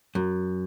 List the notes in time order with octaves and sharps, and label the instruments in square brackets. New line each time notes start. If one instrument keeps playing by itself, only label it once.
[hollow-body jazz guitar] F#2